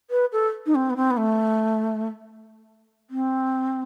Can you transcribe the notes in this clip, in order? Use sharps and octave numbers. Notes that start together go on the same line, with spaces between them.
B4
A4
D#4
C4
B3
C4
B3
A3
C4